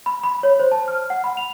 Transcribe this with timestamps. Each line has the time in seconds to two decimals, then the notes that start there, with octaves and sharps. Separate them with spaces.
0.06 B5
0.24 B5
0.43 C#5
0.60 C5
0.72 A5
0.88 F6
1.10 F#5
1.24 B5
1.37 F7